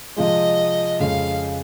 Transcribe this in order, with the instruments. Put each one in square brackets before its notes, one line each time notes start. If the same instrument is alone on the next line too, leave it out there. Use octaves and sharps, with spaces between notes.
[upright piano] C3 F3 G#3 [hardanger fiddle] D#5
[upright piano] F2 C#3 G#3 C#4 [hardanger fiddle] F5